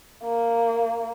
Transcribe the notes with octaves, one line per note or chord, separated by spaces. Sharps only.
A#3